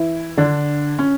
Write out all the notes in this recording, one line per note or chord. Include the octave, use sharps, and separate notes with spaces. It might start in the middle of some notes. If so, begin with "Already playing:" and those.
Already playing: E3 E4
D3 D4
C#4